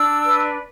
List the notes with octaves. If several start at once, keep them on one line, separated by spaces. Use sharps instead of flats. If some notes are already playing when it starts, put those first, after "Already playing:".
Already playing: D4 E6
B4